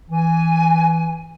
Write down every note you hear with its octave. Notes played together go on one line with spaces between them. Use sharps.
E3 G#5